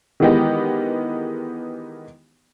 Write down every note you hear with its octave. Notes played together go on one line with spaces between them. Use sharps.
D#3 E3 G#3 B3 D#4 G4